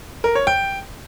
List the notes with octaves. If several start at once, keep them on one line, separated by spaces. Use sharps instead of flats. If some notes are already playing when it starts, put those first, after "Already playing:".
A#4
C#5
G5